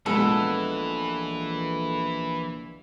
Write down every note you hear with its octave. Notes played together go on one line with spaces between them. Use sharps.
A#1 A#2 E3 G#3 B3 A4